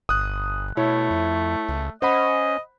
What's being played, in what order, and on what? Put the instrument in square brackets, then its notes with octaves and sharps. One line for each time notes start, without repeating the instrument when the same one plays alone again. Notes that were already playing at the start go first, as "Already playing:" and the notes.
[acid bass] G1 [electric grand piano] D#6 F#6
[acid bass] B2 [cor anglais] A3 [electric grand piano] E4 C#5
[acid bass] F2
C#2
[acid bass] C#4 [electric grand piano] C5 F#5 B5 [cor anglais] D#5